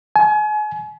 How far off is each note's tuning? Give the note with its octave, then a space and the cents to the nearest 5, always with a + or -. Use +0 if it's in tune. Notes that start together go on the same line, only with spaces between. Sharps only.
G#5 +35